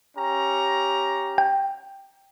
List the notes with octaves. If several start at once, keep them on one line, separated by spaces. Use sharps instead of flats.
C#4 G4 A#5
G5